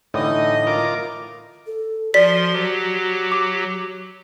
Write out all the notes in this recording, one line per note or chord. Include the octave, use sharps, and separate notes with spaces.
A2 D3 E3 D#4 D#5
F4 A#4 D6
A4
F3 F#4 D5 C6 B6
F#3 G4
D6